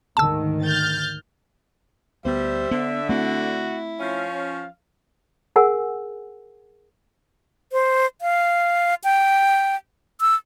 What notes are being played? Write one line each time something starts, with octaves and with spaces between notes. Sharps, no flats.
D2 G#2 D#3 A5 E6
F6 G6 A6
D2 G3 B3 C5 E5
D3 B3
A3 C4 E4 F#4
F3 C#4 F5
G#4 A#4 F#5 G#5 E6
C5
F5
G5
E6